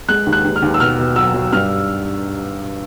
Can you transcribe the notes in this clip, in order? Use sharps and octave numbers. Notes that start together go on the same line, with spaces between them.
G#3 F#6
D#2
F#6
D#2
F6
D#2
E6
B2 F6
B2
F#3 E6
F#3
G2 F6